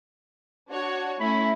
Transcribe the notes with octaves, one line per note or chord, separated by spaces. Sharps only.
D4 F#4 C#5
A3 C#4 E4 B5